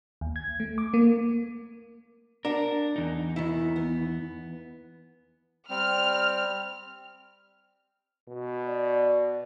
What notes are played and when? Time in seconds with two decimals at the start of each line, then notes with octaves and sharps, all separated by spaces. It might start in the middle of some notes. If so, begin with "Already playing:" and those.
0.21 D#2
0.36 G#6
0.60 A3
0.78 D6
0.94 A#3
2.45 D4 A#4 F#5
2.96 E2 D#4
3.36 D#3 E4
3.76 B3
5.70 G3 C4 F6
8.28 B2
8.67 D5